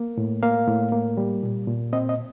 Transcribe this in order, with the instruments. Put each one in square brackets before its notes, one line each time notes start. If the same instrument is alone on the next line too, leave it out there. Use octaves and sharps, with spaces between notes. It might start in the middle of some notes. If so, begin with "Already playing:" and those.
Already playing: [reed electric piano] A#3
A2
A#3 F5
A2
A#3
G3
A#2
A#2
C4 D#5
D#5